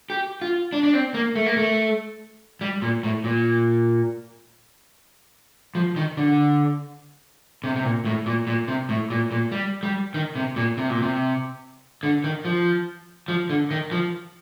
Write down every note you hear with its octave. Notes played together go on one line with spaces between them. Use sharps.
G4
F4
D4
D4
C4
A#3
A3
A#3
A3
G3
A#2
A2
A#2
F3
D#3
D3
C3
C3
A#2
A2
A#2
A#2
C3
A2
A#2
A#2
G3
G3
D#3
C3
A#2
C3
A#2
C3
D3
D#3
F3
F3
D3
D#3
F3